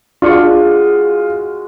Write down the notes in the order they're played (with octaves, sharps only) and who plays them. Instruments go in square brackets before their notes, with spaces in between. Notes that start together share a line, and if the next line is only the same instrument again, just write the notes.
[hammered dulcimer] G#3 F#4 [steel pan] D4 D5 C#6 [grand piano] F4